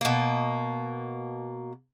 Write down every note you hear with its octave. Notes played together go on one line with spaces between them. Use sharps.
B2 A#3